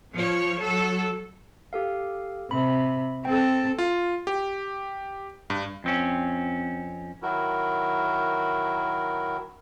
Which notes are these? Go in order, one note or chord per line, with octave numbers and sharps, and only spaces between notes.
F3 C#5
F#3 A4
G4 A4 F5
C3 B5
C4 A4 G5
F4
G4
G2
F2 C4 C#4
D#3 F#3 E4 F#4 A#4